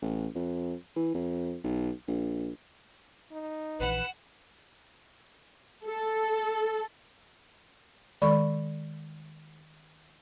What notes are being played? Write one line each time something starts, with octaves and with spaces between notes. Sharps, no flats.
A1
F2
E3
F2
B1
A#1
D#4
A#1 E3 B4 F#5 E7
A4
D#3 G#3 A4 D5 B5 C#6